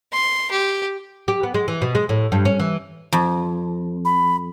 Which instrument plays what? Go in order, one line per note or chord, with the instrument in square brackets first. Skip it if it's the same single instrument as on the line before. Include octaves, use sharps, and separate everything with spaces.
[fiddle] C6
G4
[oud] G4
B3
G#3
E3
B2
G#3
A2
G2
C#4
E3
[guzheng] F2
[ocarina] B5